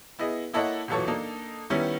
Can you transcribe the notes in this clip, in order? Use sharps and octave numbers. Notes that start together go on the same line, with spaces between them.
B3 E4 G#4 D#5
A#3 E4 A4 C#5 D#5 F#5
E1 A#2 E3 F#3 A4 C#5
A#3 D4 D#4 A4
D#3 G3 B3 C#4 E4